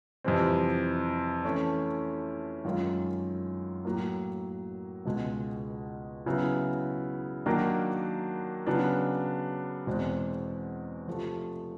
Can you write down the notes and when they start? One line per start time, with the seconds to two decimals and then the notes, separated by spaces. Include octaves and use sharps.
0.24 F2 C3 E3 G3 C4
1.45 E3 A3 C#4
2.65 F#2 D#3 G#3 C#4 F4
3.85 A2 F#3 A#3
5.05 C#2 B2 G#3
6.26 C#3 F#3 B3 E4
7.46 D#3 F#3 A#3 D4 F#4
8.67 C#3 F#3 B3 D4
9.87 E2 B2 G#3 C4
11.07 C3 F3 A3